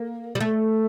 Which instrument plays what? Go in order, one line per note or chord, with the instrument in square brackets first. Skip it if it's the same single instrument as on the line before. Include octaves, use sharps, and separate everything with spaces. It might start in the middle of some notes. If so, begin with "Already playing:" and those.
Already playing: [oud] A#3
G3
A3